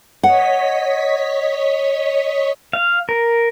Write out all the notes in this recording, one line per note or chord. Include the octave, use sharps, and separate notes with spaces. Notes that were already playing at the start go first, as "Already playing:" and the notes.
C#5 D#5 F#5 B6
F5
A#4